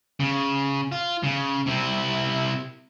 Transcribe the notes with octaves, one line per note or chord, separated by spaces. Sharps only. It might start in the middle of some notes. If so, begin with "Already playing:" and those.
C#3
F4
C#3
C3 E4